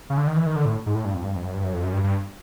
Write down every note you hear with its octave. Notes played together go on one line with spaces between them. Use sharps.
C#3
D3
D#3
E3
D#3
D3
A2
G#2
A2
G2
F2
G2
F2
F#2
G2
F#2
F2
F#2
G2
G2